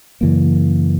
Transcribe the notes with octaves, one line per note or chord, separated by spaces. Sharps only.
F#2 C#3 E3 A#3